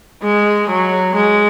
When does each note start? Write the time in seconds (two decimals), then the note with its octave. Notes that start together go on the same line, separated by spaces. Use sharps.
0.23 G#3
0.69 F#3
1.15 G#3